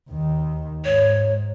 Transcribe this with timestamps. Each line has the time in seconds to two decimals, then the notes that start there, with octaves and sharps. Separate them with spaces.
0.10 D#2 D#3
0.85 G#2 C#5